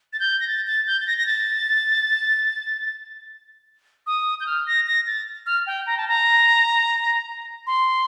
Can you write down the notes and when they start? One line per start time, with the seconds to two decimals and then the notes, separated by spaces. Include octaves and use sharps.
0.13 A6
0.20 G6
0.40 A#6
0.47 A6
0.67 A6
0.87 G6
1.00 A6
1.07 A#6
1.18 A#6
1.27 A6
4.07 D#6
4.40 G6
4.47 F6
4.67 A#6
4.87 A#6
5.07 A6
5.46 F6
5.67 G5
5.87 A#5
5.97 A5
6.08 A#5
7.67 C6